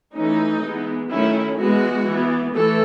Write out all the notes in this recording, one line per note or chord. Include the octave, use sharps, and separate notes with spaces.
E3 A3 C#4 D#4
E3 G#3 B3
D#3 F#3 A3 C#4 E4
E3 G#3 B3 F#4
E3 B3
E3 A3 A4